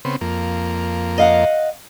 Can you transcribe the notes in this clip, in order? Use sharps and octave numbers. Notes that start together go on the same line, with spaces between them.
C#3 B3 C4
F2 A#3
D#5 F5 F#5